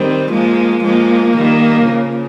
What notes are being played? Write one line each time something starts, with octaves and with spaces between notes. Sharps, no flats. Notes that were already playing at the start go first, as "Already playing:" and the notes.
Already playing: D#3 G3 C4
F3 G#3 A#3
F3 G#3 A#3
D#3 G3
C#3 F3